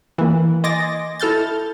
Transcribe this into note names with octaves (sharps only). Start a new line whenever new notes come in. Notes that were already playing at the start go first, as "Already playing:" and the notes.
E3 A#3
D#5 G#5 C6 D6 A6 A#6
E4 A4 F6 G6 A6